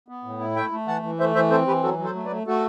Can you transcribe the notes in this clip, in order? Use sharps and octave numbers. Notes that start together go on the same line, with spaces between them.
B3
A2
E4
A3 E5 G5
A3
E3 F#5 A5
E3
A3 C5 E5
E3 C5 E5
C4 A4 C5
E3 G4 B4
F#3 F#4 A4
F#3
A4 C5
A3
B4 D5
A3
A3 F#4 A4